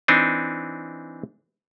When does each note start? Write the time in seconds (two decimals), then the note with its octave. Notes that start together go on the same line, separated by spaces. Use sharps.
0.08 E3 C4 D4 D#4